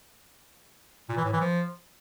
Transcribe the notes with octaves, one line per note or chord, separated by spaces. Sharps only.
A#2
E3
A2
E3
F3